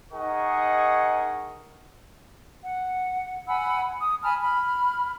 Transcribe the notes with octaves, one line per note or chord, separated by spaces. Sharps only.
D#4 G#4 A#4 D#5 F#5 C#6
F#5
F#5 G#5 B5 E6
D#6
G#5 A5 B5 F6
B5 F6